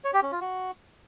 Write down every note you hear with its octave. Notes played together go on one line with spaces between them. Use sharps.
C#5
G4
C#4
F4
F#4